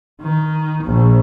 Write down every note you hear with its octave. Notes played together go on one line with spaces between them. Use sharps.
D#3
A#1